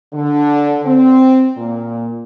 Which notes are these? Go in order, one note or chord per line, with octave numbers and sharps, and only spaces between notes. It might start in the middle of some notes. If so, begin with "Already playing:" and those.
D3
C4
A#2